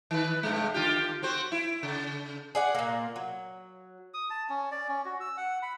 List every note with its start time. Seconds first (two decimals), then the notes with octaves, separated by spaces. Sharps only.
0.11 D#3 B4
0.43 G2 C3 G#3
0.74 D3 F4 G4
1.22 C4 F#4 C5
1.52 E4
1.83 C#3
2.55 G#4 D5 F#5
2.75 A#2 A#3
3.16 F#3
4.14 D#6
4.30 A5
4.49 C#4
4.71 D5
4.89 C#4
5.05 F#4
5.20 E6
5.37 F#5
5.62 B5